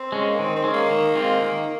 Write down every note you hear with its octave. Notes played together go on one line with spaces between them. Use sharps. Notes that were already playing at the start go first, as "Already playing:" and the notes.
Already playing: C4
G#3 C#4
A#3
D#3 C4
C4
G#3 C#4
A#3
D#3
G#3 C4 F4
D#3